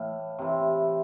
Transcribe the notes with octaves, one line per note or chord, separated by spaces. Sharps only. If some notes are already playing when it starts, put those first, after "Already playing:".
Already playing: A2 E3 F5
C3 E3